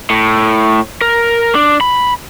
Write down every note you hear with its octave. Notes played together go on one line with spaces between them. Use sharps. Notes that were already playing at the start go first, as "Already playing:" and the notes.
A2
A#4
D4
B5